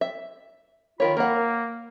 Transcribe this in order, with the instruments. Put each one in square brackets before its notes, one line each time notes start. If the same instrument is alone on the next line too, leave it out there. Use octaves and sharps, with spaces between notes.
[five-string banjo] E5
[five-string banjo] D#3 A#4 C#5 [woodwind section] F4 B5
[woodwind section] A#3 [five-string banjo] A#4 F#5